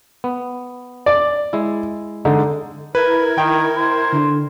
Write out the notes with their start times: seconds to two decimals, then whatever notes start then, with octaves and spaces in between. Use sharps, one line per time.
0.24 B3
1.06 D5
1.53 G#3 E4
2.25 D3 G#3 D#4
2.95 E4 A#4 B4 G#6
3.38 D#3 G5
3.77 C5
4.13 D3